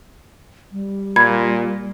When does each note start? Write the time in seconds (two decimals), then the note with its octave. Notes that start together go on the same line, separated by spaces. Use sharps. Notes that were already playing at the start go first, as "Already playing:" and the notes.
0.72 G3
1.16 A#2 B5 G#6